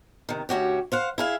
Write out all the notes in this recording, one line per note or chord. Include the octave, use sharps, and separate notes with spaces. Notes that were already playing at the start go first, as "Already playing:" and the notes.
C3 D#3
D2 C#4 F#4 G4
C5 F5 F#5
E4 G#4 F5